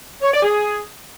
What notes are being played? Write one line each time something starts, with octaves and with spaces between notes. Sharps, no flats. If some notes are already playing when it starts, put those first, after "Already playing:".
C#5
D5
G#4